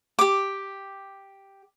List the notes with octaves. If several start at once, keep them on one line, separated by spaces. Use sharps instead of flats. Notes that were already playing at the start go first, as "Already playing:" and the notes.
G4 D6